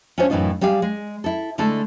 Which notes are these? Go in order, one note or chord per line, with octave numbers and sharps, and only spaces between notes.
C#4 D4 F4 C5 C#5
F#2 A2 E3 A3 D#4 F4
G3 G4 G#4 F5
G#3
E4 A4
D3 G#3 A3 E4 A4